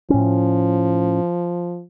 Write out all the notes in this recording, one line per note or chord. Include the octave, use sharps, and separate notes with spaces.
A2 F3 C#4